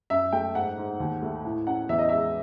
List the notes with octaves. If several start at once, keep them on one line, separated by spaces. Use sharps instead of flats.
F#2 E5
A3 G5
G#2 F#5
G#2
D#2
A3
A2
C#4 F#5
E2 E5
D#5
G#3 E5